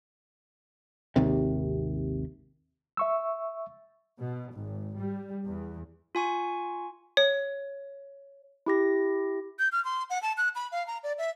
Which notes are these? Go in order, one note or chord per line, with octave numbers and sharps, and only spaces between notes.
G#1 D#2 C3
E5 C#6 E6
B2
G#1
G3
E2
F4 G#5 C#6
C#5
E4 G4 A#6
G6
F6
C6
F#5
A5
F#6
B5
F5
A#5
D5
E5